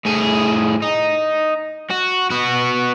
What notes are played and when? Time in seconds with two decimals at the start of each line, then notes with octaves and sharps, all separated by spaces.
0.05 A2 G#4
0.82 D#4
1.90 F#4
2.30 B3 F#4